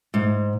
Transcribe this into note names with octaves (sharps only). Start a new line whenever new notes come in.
G#2